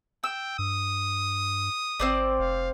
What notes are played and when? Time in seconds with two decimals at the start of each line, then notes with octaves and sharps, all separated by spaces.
0.23 G5 E6
0.59 G2 D#6
1.99 G#1 C4 C5 D5
2.39 F1 F5